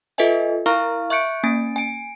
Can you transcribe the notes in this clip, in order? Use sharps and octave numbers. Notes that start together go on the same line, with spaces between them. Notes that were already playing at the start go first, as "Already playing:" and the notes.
F4 A4 B4 D#5 E5 G#5
E4 A#4 F5 A#5 C#6 F6
E5 C#6 F#6 G6 C#7 D7
A#3 C#4 G#5 A6 D7
G#5 D7